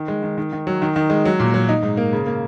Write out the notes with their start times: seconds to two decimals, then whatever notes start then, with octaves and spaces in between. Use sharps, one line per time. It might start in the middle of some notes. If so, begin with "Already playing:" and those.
Already playing: D#3
0.08 G#3
0.23 D#3
0.38 D#3
0.53 D#3
0.67 F#3
0.82 D#3
0.96 D#3
1.10 G#3
1.25 F#3
1.40 A#2
1.54 F#3
1.69 D#4
1.83 G#2
1.97 A#3
2.13 C#3
2.26 A#3